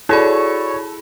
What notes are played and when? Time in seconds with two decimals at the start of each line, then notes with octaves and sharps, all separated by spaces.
0.09 E4 F#4 G#4 A4 C#5 D5 B5